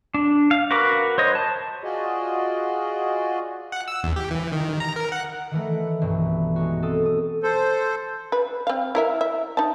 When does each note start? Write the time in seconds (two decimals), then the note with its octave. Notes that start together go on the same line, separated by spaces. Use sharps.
0.14 D4
0.51 F5
0.71 F#4 A#4 B4 D6
1.18 C5 C#5 D#5
1.35 A5
1.83 F4 F#4 G#4 D5 D#5
3.72 F#5
3.88 E6
4.04 E2
4.16 G4
4.31 E3
4.52 D#3
4.80 A#5
4.96 A#4
5.12 F#5
5.51 D#3 E3 A3
6.01 B1 G2 E3
6.56 G#3 D#4 F#4
6.82 C4 A4 D#6
7.05 D#6
7.43 A4 C5
8.32 B4
8.67 C4 F5
8.95 E4 A#4 E5
9.21 E5
9.57 D#4 A5